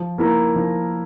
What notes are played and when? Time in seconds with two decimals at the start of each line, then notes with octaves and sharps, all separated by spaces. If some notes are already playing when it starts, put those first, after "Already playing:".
Already playing: F3
0.18 A#3 E4 A#4
0.55 F3